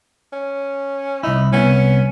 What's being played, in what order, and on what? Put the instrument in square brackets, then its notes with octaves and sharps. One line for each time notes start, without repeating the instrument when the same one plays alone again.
[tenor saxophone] C#4
[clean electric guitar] C2 E4 [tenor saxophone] D#4
[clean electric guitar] C2 B3 [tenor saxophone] C#4